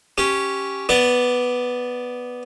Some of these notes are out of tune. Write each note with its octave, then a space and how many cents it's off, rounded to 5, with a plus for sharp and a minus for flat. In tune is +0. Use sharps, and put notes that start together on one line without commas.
C#4 +0 G4 -5
B3 +0 D5 +0